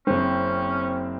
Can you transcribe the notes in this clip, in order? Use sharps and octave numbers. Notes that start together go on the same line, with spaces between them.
F#1 C4 C#4